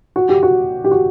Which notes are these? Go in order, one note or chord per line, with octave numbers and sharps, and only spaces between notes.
F#4
G4
F#4
G4
F#4